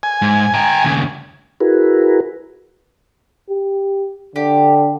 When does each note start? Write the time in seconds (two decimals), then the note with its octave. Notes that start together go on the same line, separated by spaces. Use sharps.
0.03 G#5
0.22 G#2
0.54 G5 A#5
0.84 D#2 C#3
1.60 E4 F#4 G#4 A#4 B4
3.50 G4
4.36 D3 G4